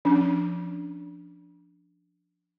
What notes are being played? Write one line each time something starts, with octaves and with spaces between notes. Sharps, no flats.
F3 C#4 D4